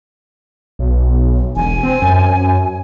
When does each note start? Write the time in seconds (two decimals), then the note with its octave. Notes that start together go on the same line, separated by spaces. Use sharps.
0.79 B1
1.56 E1 G#5
1.83 C4
2.02 F#2